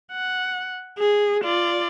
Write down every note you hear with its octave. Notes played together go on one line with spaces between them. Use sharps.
F#5
G#4
F4 D5